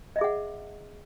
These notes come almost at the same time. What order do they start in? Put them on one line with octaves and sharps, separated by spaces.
D#5 E5 G#4 F#5